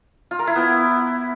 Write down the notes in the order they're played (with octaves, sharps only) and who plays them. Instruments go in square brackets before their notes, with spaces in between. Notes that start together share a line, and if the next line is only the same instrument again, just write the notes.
[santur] F4
A#4
E4
B3